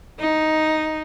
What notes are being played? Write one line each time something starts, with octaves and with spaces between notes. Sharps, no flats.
D#4